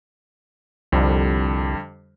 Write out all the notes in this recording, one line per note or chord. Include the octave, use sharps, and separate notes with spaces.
C2 F2 D3 G3